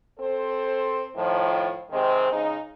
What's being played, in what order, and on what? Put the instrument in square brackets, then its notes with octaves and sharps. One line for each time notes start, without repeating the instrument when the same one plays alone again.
[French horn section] C4 A4 C5
A2 D#3 F3
C3 D#3 G#3 C4
C#3 G#3 D#4